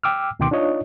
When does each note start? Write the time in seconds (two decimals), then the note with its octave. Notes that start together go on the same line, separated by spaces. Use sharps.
0.03 G5 D6 E6 F6
0.39 D2 B2 D#3 G5 C6 D6
0.51 D4 D#4 F4 C#5 D#5